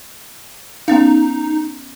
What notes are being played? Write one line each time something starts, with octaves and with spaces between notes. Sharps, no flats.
B3 C#4 D#4 F5